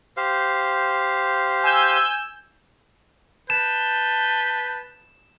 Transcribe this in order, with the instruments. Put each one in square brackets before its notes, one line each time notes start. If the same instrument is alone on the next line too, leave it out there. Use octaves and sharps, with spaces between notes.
[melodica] G4 C5 F5
[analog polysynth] G#5 E6 G6
[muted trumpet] B4 [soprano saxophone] A5 [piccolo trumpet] G6 [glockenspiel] E7